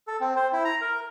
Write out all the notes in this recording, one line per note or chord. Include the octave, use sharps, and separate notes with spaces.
A4
C4
C5
E4
A#5
A#4